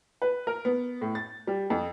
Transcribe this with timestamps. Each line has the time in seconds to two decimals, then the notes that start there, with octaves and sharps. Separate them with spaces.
0.22 B4
0.47 A#4
0.65 B3
1.01 A2
1.15 A6
1.47 G3
1.70 F2